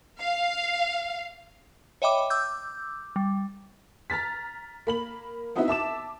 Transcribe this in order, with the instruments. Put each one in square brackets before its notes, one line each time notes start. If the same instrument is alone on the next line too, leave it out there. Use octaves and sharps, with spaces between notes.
[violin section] F5
[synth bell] C#5 D#5 E5 G5 B5 D6
D6 E6 G6
G3
[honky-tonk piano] A#5 F6 A6 B6
A#3 B5 F#7
B3 C4 D#4 E4 F#4 E5
E5 A5 D6 E7